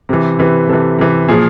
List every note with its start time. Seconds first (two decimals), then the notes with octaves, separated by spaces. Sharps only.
0.09 C3 E3
0.39 C3 E3 B4
0.69 C3 E3 A4
0.98 C3 E3
1.28 A#2 F3 G#4